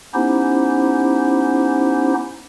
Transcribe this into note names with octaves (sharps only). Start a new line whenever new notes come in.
B3 C#4 D#4 E4 G4 C5